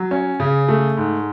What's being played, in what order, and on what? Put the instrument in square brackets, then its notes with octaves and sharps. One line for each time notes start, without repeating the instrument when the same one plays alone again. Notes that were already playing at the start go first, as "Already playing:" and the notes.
Already playing: [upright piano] F#3
C#4
C#3
A3
G#2